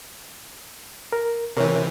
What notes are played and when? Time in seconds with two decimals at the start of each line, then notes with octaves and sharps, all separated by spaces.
1.12 A#4
1.57 C3 E3 A#4 C#5